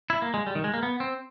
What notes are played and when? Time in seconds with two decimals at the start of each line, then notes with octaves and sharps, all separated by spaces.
0.10 E4
0.22 A#3
0.34 G#3
0.47 G3
0.55 D#3
0.64 G#3
0.74 A#3
0.83 B3
1.00 C4